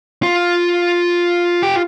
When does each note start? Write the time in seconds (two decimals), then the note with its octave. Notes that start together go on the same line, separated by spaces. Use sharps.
0.23 F4
1.63 G4